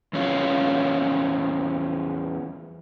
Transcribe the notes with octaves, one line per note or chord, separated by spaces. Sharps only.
E2 C#4 F4